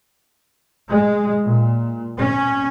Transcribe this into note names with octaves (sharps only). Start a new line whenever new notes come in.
G#3
A#2
C#4